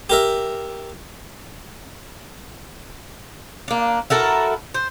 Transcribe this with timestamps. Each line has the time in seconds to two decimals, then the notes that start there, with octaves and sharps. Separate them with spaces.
0.10 G4 A#4 E5
3.68 A#3 D4
4.10 E4 F#4 A4 A#4
4.74 C5